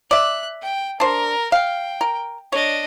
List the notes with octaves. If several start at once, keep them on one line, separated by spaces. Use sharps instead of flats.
D5 E5 F#6
G5
D4 A#4 C5
F5 G5
A#4
D4 C#5 D#5